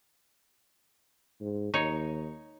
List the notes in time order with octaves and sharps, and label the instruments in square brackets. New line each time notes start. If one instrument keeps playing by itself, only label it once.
[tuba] G#2
[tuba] D#2 [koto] D#4 C#5